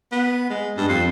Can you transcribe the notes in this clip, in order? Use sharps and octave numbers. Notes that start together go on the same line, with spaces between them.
B3
G#3
G2
F2